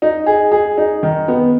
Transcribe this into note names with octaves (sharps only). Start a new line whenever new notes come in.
D#4
G#4
G#4
D#4
D#3
B3